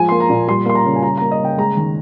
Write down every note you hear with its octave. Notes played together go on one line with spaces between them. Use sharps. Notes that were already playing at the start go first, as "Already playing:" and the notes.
Already playing: F3 G#3 G#5
A#3 C6
A#5
A#2
G3 C6
A#3 C6
A#5
C#3
G#5
G3 A#5
A#3 A#5
D#5
C#3 G5
G#3 A#5
D#3